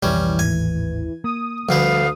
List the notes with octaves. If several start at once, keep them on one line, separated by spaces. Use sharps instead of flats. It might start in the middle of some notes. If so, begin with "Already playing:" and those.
B1 F2 E3 G3 C#4
G#1 D#2 A2 G#5
A#3 D#6
D2 D3 F3 G3 B4 F5